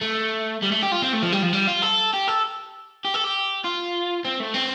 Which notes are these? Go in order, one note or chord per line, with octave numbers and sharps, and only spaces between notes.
A3
G3
A3
G4
F4
C4
A3
F3
G3
F3
G3
F4
A4
G4
A4
G4
A4
G4
F4
C4
A3
C4